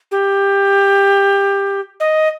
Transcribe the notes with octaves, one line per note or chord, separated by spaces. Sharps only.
G4
D#5